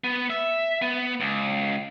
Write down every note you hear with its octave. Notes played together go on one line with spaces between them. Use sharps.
B3
E5
B3
C#2